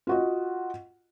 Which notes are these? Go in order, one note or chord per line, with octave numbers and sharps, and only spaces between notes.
F4 F#4 D#5